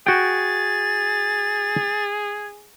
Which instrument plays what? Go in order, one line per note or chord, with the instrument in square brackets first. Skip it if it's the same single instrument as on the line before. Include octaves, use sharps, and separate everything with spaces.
[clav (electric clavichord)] F#4 G5 [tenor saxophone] G#4 [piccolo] G#6 [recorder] A6